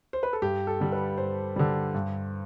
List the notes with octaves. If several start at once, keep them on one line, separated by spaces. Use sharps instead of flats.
C5
B4
A4
G2 G4
A4
D3 G3
B4
G2 C5
D3 G3
G2